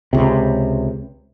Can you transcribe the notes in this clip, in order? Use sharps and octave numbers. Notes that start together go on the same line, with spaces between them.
C#2 C3